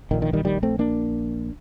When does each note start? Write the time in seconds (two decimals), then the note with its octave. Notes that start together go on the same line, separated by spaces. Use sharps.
0.11 A#1 D#3
0.14 A#2
0.22 D#3
0.33 D#3 G3
0.45 D#3 G3
0.63 A3 C4
0.79 A#3 D4